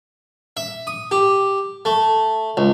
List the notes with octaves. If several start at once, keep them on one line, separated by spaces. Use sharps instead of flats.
E5
D#6
G4
A3
C#2